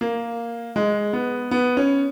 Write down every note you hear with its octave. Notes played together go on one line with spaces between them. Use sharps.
A#3
G#3
B3
B3
C#4